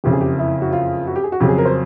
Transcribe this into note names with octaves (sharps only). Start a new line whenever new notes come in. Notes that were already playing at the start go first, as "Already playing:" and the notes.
F#1 F2 C#3 G4
G#4
G4
E4
F#4
F4
F#4
G4
G#4
F#4
F2 C#3 F#3 G4
G#4
A#4
C5